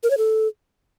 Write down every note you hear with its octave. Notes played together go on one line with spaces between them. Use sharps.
A#4
C#5
A4